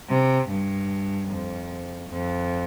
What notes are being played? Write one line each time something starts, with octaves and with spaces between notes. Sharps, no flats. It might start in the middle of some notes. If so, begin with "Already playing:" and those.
C3
G2
F2
F2